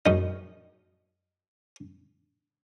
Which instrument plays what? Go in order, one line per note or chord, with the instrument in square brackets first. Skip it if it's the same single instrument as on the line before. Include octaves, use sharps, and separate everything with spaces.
[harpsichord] F#2 D#4